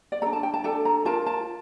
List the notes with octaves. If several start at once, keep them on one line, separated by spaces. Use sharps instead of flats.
D5
A4 A#5
D4
A5
G5
A5
D4 A4 A5
A#5
F4 A#4 A5
A5